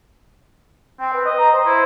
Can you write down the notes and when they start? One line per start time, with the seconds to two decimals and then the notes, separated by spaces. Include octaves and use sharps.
0.99 C4 G5
1.13 B4
1.25 D#5
1.37 A#5
1.52 C5
1.66 E4